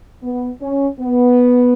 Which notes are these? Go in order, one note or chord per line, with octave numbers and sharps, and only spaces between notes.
B3
C#4
B3